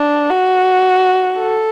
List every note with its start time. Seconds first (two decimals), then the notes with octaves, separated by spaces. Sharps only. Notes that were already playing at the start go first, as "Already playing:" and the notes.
Already playing: D4
0.31 F#4
1.38 A4